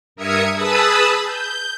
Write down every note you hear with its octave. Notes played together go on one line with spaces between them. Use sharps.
G2 A#4 E5 D#6 G#6 C#7
G#4 B4 A5 B5 D#6 E6
G6